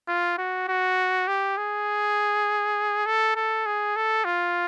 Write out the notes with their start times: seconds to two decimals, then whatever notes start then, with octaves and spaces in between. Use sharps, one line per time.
0.08 F4
0.38 F#4
0.68 F#4
1.28 G4
1.57 G#4
3.06 A4
3.36 A4
3.66 G#4
3.96 A4
4.25 F4